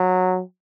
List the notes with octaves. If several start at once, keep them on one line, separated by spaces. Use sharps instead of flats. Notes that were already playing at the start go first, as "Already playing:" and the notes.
Already playing: F#3